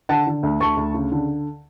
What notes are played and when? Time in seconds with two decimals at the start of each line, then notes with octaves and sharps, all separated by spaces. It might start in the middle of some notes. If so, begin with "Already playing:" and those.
0.09 D3 F#5 A5
0.27 D3
0.43 D2
0.60 D2 A5 C#6
0.77 D2
0.94 C#3
1.12 D3